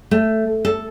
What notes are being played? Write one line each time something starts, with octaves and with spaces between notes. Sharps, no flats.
A3
A4